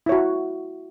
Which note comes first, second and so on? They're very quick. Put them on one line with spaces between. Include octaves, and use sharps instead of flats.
E4 C#5 F#4